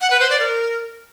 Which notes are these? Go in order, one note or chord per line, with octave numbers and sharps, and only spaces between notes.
F#5
B4
C5
D5
A#4